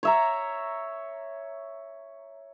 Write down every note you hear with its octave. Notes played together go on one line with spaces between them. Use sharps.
C#5 E5 A#5